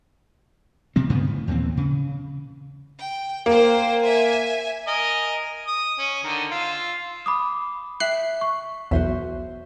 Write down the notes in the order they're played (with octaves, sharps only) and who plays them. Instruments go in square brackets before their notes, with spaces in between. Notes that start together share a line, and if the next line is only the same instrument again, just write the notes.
[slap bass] C3 F3 C4
G2 C#3 F3 B3
A2
D#2 A#2 E3 C4
C#3
[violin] G5
[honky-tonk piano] A#3 [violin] C5 G5
[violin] E5 G#5
[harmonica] A#4 D#5 G#5
D#6
C#4
D3 D#3
F4 E6
[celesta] B5 D6 D#6
[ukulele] E5 G5 [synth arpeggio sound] F#6 C7
[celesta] C#6
[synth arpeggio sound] B1 E2 [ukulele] F#4 C5 E5